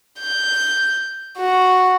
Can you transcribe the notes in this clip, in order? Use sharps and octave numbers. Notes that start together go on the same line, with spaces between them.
G6
F#4